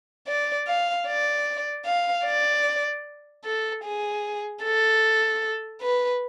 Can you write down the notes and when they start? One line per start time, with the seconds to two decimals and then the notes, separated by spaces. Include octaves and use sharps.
0.27 D5
0.67 F5
1.07 D5
1.86 F5
2.25 D5
3.45 A4
3.84 G#4
4.63 A4
5.81 B4